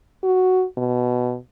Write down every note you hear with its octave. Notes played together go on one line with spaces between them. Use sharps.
F#4
B2